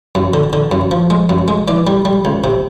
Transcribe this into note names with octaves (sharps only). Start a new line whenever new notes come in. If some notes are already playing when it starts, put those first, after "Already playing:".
F#2
D3
D3
F#2
F3
G#3
F#2
G#3
E3 D5
G3
G3
C#2
C3